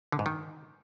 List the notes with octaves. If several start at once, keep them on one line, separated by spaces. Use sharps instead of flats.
D3
G#2
D#3